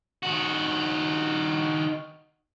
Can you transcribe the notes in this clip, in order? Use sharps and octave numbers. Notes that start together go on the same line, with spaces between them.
D#3 F#4